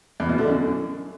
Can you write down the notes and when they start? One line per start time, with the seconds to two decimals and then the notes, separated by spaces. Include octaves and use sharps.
0.20 E2
0.29 B2
0.38 D3
0.48 F#2